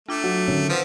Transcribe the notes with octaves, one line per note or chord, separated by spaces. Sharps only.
A3 D4 F4 D6
F#3
D3 D#3 C#4
F3 B4 C5 F#5